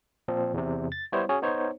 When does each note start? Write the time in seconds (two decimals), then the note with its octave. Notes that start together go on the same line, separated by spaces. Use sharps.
0.28 A#2 F3 C4
0.54 E2 C3
0.92 A6
1.12 G3 B3 E4 C5 C#5
1.29 C#4 F#4 G#4 C#5
1.42 B3 D#4 C5 C#5